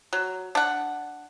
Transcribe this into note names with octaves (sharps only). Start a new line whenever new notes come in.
F#3
D4 F#5